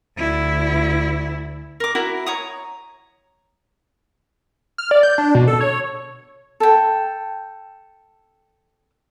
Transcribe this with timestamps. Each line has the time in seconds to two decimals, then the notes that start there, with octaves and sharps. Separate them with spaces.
0.18 D2 E4
1.80 A#4 D6
1.95 E4 F#4 A#4 E5
2.26 C#5 A#5 D#6
4.78 F6
4.91 D5
5.03 G6
5.18 D4
5.35 B2
5.48 A4
5.61 C#5
6.60 A4 G5